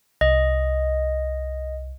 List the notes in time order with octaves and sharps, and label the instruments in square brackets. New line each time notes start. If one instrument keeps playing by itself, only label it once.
[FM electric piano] C2 [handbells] D#5